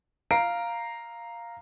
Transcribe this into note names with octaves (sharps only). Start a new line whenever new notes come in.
F5 A#5 C7 D7